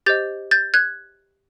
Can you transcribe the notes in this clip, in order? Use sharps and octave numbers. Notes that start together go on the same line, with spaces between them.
G4 C5 D#5 G6 A6
G6 A6
F#6 G#6